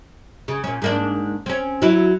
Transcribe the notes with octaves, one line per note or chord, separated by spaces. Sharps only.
C#3
A#2 C#4
G#2 A#3 D4
C4 C#4
F#3 E4